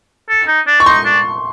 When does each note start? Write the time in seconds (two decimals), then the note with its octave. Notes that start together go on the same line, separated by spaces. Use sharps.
0.29 A4
0.47 D#4
0.67 D4
0.80 C#6
0.86 D#4 C6
1.05 D4